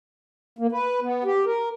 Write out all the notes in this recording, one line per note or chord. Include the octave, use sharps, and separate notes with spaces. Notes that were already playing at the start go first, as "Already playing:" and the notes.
A#3
B4
B3
G4
A#4